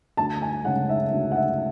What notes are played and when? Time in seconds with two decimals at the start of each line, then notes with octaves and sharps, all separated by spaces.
0.17 D2 A5
0.42 G#5
0.65 C#3 G#3 F#5
0.89 E5
1.12 D2
1.32 F#5
1.36 E5